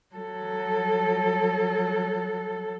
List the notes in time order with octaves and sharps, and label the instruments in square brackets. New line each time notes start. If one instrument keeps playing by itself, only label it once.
[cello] F#3 A4